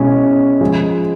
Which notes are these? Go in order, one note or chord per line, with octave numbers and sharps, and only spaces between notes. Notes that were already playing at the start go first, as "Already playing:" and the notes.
Already playing: B2 G#3 C#4 E4
F3 G#3